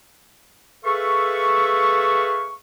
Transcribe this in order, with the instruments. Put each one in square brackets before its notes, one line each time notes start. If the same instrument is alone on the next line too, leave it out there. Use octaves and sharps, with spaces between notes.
[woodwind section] G#4 A4 B4 E5 F5 C#6